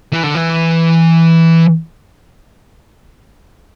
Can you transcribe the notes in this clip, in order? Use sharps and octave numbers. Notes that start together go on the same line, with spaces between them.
E3
D3
E3